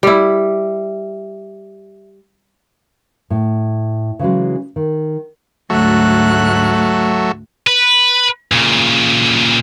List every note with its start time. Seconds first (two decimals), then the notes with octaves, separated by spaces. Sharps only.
0.03 G3 E4
3.30 A2
4.19 C#3 E3 F#3 G#3
4.76 D#3
5.70 D2 G#2 F#3 A3 F#6
7.67 B4
8.52 A#2 C#3